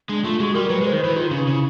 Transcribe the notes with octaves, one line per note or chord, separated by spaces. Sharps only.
G#3 D4
A3 F4
G#3 F#4
G3 A#4
F#3 B4
G#3 C5
D#3
E3 B4
D#3 F4
D#4
C#3
D#4
C#3 E4